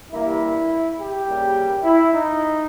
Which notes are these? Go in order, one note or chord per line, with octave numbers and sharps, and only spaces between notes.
G2 E3 G3 A#3 E4
G4
C#3 G3 A#3
E4
D#4